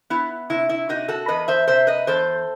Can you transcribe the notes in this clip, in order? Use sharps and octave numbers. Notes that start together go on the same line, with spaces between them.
B3 E4
C3 E4
E4
C3 D#4 F#4
F#4 A4
E2 B4 D#5
C5 E5
C3 C5 E5
B4 D#5
E2 A4 C5